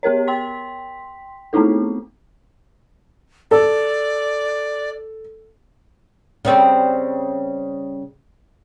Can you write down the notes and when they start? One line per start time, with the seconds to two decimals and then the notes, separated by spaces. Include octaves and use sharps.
0.03 B3 G4 A#4 C#5
0.27 G5 C6 B6
1.53 A3 B3 C4 D#4 E4 A4
3.51 A4 D5
6.45 C#3 G3 C4